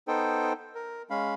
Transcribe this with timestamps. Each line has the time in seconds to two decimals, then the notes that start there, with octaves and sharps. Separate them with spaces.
0.08 B3 D#4 A4 C5 G5
0.75 A#4
1.10 G#3 C#4 F5 B5